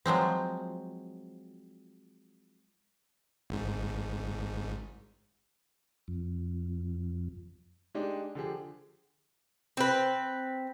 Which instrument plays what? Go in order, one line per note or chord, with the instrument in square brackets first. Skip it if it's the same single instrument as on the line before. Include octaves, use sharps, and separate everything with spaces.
[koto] F3 F#3 G#3 C4
[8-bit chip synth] G#1 G#2
[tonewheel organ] F2
[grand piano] G#3 D4 D#4 G4
D3 F3 G4 G#4
[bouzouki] C4 B4